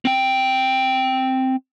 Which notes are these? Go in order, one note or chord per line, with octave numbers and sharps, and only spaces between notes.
C4 G5